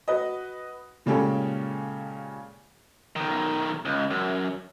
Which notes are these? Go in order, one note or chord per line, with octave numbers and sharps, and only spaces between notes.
F#4 B4 D#5
A#2 C#3 G#3 C#4 G4 A4
B1 D#3
C#2
F#2